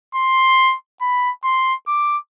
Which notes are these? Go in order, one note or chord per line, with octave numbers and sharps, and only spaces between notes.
C6
B5
C6
D6